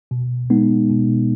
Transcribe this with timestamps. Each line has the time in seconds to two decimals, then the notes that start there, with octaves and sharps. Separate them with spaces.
0.11 B2
0.50 G#3 B3 D#4
0.90 B2